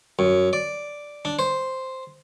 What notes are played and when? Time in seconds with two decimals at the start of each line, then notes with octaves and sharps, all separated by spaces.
0.19 F#2
0.53 D5
1.25 D4
1.39 C5